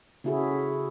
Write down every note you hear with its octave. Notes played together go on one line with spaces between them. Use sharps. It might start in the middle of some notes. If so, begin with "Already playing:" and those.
C#3 C#4 E4 F#4 G#4 A4